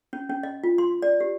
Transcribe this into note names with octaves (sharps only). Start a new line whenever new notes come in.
C#4
C#4
D#5
F4
C6
D5
G4